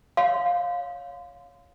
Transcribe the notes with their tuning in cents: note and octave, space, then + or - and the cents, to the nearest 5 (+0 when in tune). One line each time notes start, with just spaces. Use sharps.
C#5 +10 F5 +15 C6 -35